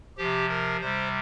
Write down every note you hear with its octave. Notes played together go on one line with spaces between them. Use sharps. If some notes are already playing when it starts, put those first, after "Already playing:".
C3 F3 G4
A#4
C3 G3 C5